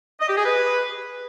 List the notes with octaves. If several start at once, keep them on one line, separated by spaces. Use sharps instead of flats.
D#5
G4
G#4
B4